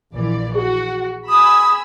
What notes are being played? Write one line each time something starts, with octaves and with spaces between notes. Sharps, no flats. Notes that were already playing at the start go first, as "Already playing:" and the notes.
A#1 E3 D5
F#4 G#4
G#5 B5 D#6 E6